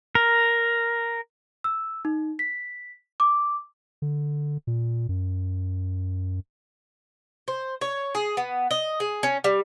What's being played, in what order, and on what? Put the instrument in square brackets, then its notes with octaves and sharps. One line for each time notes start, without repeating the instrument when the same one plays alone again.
[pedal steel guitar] A#4
[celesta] E6
D#4
B6
D6
[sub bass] D3
A#2
F#2
[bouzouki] C5
C#5
G#4
B3
D#5
G#4
C#4
G3